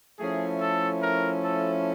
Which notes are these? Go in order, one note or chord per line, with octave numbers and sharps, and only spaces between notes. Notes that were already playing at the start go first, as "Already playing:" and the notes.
F3 A3 C#4 E4 G#4
A4
A#4
A4